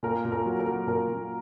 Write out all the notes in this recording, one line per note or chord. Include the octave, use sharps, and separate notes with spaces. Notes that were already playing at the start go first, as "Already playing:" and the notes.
A#2 A#4
A#2
A#4
F#3
A#4
F#3
A#2 A#4
A#2